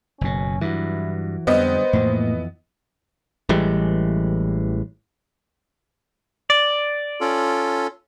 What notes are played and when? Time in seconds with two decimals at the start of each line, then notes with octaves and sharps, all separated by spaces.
0.21 F#1 B2 C#4
0.61 G2 E3 F#3 E4
1.47 F2 D3 G3 B3 C5 D#5
1.93 F2 A2 E3 A#3
3.49 A1 E3 G3 G#3
6.50 D5
7.21 C#4 F4 A4